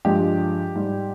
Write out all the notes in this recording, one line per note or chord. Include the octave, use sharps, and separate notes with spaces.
G2 F3 G#3 G4
G#2 G3